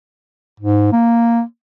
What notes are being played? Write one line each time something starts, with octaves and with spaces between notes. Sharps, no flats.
G#2
A#3